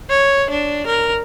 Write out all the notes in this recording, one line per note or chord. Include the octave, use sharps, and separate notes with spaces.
C#5
D4
A#4